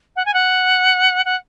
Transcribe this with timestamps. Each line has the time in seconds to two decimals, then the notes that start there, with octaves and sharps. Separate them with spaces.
0.16 F#5
0.25 G#5
0.33 F#5
1.25 F#5